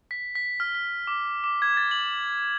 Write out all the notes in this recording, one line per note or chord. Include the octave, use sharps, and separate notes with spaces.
B6
B6
F6
B6
D6
D6
G#6
A6
F#7